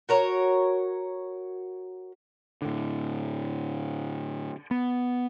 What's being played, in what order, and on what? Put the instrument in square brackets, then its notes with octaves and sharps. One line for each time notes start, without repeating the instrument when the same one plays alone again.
[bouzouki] F#4 A#4 C#5
[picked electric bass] A2 D3
B3